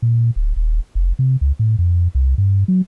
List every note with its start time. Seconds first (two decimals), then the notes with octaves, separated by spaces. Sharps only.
0.02 A#2
0.36 D1
0.56 D#1
0.95 F1
1.19 C3
1.41 C#2
1.59 A2
1.79 F2
2.15 C2
2.38 G2
2.68 F#3